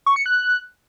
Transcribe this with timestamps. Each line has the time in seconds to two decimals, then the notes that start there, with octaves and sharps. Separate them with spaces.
0.06 C#6
0.16 C#7
0.26 F#6